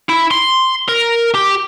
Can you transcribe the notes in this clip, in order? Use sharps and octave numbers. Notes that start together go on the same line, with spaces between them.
E4
C6
A#4
G4